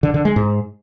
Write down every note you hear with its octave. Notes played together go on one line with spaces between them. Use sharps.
D3
D3
G#3
G#2